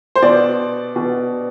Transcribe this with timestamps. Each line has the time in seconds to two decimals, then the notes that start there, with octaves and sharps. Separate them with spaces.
0.15 C5
0.22 B2 D5
0.96 B2